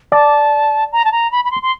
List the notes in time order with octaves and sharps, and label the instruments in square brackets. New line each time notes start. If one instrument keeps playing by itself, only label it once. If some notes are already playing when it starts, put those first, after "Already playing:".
[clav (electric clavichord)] D5 [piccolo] A5
[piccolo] A#5
A5
A#5
B5
B5
C6
C6